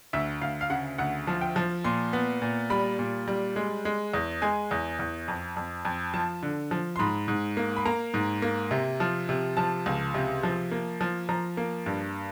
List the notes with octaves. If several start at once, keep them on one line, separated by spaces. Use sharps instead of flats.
D2 E5
D2 F5
F5
C#3 F#5
D2 F#5
F3
G5
F3
A#2 C6
B3
A#2
G3 B5
A#2
G3
G#3
G#3
E2
G#3 G#5
E2
E2
F2
F2
F2
F3 A5
D3
F3
C6
G#2 B5
G#2
A#3
B5
A#3 A#5
G#2
A#3
C3
F3
C3
F3 A5
C#2
C3
F3
A#3
F3
F3 A#5
A#3
G2